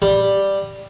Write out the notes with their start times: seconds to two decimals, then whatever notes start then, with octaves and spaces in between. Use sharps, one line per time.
0.02 G3